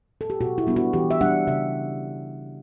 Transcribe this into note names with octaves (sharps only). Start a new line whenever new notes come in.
A4
G4
B2 F#4
E4
G3 B3 D4
F#4
E3 G4
E5
G3 D4 F#5
C#3 E5